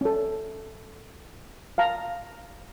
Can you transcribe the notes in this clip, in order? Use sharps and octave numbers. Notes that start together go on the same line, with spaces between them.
C#4 A4
F5 A5 A#5